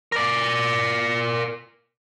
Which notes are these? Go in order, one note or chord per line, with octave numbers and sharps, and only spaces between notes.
A#4 D5